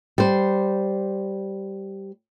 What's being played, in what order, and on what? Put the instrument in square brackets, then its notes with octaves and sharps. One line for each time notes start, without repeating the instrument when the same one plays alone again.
[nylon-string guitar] G3 C5